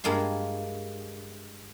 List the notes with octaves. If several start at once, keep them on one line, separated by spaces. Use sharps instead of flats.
G2 G#3 A#3 F4 C6